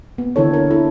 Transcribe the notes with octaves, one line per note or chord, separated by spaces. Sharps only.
B3
D3 D#3 D4 E4 A4 C#5
A#4
E4 A4